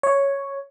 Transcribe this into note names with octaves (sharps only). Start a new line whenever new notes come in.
C#5